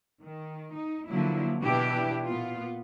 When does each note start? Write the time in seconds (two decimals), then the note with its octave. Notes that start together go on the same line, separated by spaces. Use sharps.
0.23 D#3
0.77 D#4
1.08 D3 F3 F#3 A#3 E4
1.61 B2 E3 D4 E4 G4 B4
2.25 A#2 B3 F4